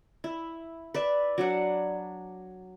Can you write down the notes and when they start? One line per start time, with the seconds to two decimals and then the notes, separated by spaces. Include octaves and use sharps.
0.24 E4
0.94 B4 D5 E5
1.38 F#3 D4 F#5